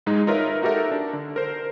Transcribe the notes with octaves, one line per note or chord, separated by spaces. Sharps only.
G#2 G#3 D#4
D#4 F4 A#4 B4 C#5 E5
D#4 F#4 G4 A4 A#4 E5
D4
D3
A#4 C5